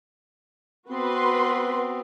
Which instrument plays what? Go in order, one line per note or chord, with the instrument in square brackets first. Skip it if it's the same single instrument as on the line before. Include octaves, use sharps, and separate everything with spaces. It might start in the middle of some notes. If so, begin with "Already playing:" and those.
[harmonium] B3 C4 [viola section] F#4 B4 C6